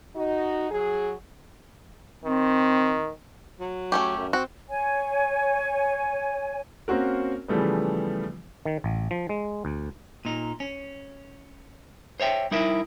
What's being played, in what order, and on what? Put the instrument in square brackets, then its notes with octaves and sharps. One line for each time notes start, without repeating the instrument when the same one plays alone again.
[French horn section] D#4 F#4
F#3 G#4
[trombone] D#3 [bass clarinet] C4
[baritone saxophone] F#3
[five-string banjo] A3 C#4 G4
[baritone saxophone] F#2
[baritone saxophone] C4 [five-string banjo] F#4
[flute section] C#5 G#5
[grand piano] A#3 C4 C#4 F#4 A#4
C#3 E3 F3 G3 A3 B3
[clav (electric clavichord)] D#3
A1
F3
G#3
D2
[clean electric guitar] A#2 D#4
C#4
C5 C#5 E5 G5
G3 D#4 E4 A#4 E5